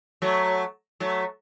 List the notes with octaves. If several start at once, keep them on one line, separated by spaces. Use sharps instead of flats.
F#3 A3
F#3 A3